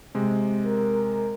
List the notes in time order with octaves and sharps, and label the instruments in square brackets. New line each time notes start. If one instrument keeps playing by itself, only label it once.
[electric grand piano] C3 G#3
[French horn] A#4